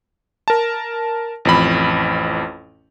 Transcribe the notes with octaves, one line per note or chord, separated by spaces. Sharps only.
A#4 A5
A1 F2 B5